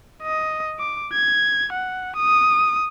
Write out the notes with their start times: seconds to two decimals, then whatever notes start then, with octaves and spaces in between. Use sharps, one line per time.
0.23 D#5
0.80 D6
1.13 G#6
1.73 F#5
2.16 D#6